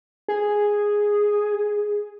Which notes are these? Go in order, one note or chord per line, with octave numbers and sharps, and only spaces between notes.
G#4